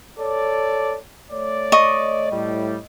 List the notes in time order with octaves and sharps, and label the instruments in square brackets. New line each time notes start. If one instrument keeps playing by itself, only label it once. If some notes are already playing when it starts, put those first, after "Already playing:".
[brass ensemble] A4 C#5 D5
A3 C#5 D5
[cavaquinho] D#5 C#6
[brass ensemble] A2 G3